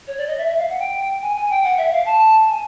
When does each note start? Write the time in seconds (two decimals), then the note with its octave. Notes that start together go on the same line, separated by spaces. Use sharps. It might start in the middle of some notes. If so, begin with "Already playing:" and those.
0.07 C#5
0.17 D5
0.27 D#5
0.38 E5
0.48 E5
0.58 F5
0.70 F#5
0.79 G5
1.22 G#5
1.36 G#5
1.50 G5
1.64 F#5
1.78 E5
1.92 F5
2.06 A5
2.49 G#5